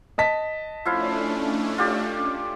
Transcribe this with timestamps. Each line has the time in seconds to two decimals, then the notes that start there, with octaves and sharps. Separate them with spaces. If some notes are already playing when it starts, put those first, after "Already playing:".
0.18 D#5 A5 B6
0.85 F3 A3 C#4 D4 E4 F5
1.78 F4 G4 D5